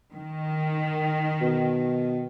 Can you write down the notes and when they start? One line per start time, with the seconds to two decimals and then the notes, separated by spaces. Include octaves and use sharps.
0.14 D#3
1.41 B2